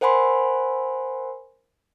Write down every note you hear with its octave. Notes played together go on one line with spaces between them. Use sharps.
A#4 C5 F#5 G#5 B5 C6